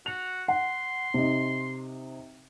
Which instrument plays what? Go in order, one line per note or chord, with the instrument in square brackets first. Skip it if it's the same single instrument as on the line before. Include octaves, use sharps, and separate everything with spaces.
[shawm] F#4 [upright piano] F7
[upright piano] F#5 [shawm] C6
[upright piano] C3 D#4